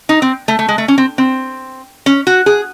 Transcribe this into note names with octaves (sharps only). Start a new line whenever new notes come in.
D#4
C4
A3
A3
G#3
A3
C#4
C4
C4
C#4
F#4
G#4